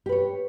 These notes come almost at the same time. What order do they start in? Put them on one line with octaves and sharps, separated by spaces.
G4 B4 C#5